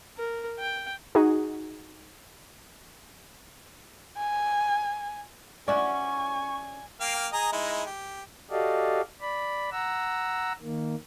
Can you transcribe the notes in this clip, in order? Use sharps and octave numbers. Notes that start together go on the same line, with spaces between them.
A#4
G5
D#4 F#4 G#4
G#5
C#4 E4 F#4 D5 G#5 C#6
A#3 F5 G5
G#4 D#5 A#5
G#3 D#4 E4
G4
F#4 G4 A4 D5 D#5 F5
D5 B5
F#5 A#5 E6
D#3 A#3